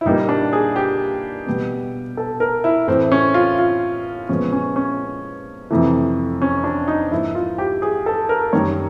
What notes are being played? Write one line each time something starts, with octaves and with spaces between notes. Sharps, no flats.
E4
A#2 G3 A#3 D#4
D4
G#4
G4
B2 G3 B3
A4
A#4
E4
A2 E3 A3 C4
C#4
F4
F4
A#2 F3 G#3 B3 C#4
C#4
C#4
F2 C3 E3 A3
C#4
D4
D#4
G#2 F3 A#3 E4
F4
G4
G#4
A4
A#4
F#2 D#3 G3 C#5